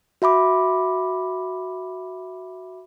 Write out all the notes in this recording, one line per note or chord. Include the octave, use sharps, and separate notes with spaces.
F#4 E5 B5 D6